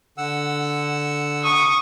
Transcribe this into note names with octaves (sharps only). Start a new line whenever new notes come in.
D3 F#5 E6
C#6 D#6